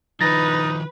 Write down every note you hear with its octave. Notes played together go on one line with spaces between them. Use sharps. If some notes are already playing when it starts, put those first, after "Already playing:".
D#3 F3 D#4 B4 A6 A#6